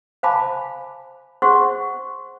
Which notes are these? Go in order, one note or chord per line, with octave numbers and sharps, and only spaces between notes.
C5 F5 G#5 A5 B5 D6
G#4 C5 F#5 C6 C#6